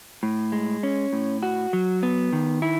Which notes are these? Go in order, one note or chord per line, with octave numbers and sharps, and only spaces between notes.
A2
G#3
C#4
A2
F#4
F#3
B3
D#3
E4